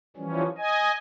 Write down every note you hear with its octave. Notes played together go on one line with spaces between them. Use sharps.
E3 F3 G3 C#4
D#5 G#5